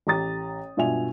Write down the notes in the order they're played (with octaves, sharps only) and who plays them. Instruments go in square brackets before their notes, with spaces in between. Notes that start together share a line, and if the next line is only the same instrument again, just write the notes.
[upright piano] A1 G4 A#5 D#6 A6
G2 B2 F4 E5 G#5 F7